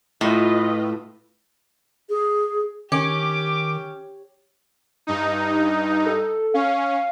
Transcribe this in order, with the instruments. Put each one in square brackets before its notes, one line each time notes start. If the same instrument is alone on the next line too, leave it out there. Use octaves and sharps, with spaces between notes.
[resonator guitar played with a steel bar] A2 [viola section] F4 B4 D#5
[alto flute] G#4
[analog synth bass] D#3 [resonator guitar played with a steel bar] C#4 [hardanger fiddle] G4 [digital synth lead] D6
[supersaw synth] G2 D#4
[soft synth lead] A4
[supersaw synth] C#4 [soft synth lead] F5